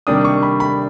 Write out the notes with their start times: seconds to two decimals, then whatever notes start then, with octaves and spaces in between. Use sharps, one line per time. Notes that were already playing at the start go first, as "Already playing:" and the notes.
0.07 C3 D#3 G3 A#3 D4 D#6
0.25 C#6
0.43 B5
0.60 B5